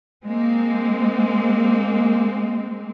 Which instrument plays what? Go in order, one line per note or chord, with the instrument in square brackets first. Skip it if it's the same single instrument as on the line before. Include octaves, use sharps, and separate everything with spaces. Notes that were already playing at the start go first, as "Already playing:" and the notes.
[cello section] G#3 A#3 C4